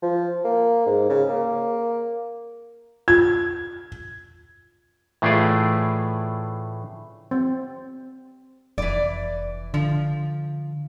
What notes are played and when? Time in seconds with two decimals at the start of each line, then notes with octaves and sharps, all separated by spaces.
0.02 F3
0.44 A#3
0.86 G#2
1.09 C#3
1.29 A#3
3.08 F4 G#6
5.22 A2 E3 A3 F4 G#4 D5
7.31 C4
8.78 F1 E3 D5
9.74 D3 F3